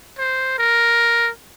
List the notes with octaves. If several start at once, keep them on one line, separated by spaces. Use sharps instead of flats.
C5
A#4